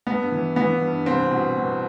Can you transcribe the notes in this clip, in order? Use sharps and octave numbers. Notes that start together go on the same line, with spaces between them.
G2 B3
E3
E3 B3
G2
C2 C4
B2
B2